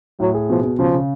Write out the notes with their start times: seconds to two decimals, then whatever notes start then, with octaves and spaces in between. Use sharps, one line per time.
0.20 A2 F#3
0.34 G#4
0.50 B2 F3
0.64 B2
0.79 C#3 F3
0.94 C#3